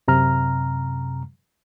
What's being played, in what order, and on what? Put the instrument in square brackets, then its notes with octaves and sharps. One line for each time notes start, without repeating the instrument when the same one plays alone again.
[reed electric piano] F#2 C3 A#5 F6